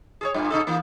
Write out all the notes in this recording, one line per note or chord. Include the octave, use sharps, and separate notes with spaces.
G#4 A4 C#5
G2 A#2
C3 D#4 A4
E3 A#3